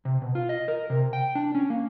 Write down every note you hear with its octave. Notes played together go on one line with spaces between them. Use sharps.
C3
B2
F4
D#5
A#4
C3
G5
D4
C#4
A#3